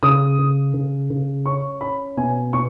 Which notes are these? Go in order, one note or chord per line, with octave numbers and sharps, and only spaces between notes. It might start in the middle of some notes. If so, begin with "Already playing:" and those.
C#3 D#6
C#3
C#3
C#3
C#4 C#6
C#4 B5
B2 G#5
B2 C#6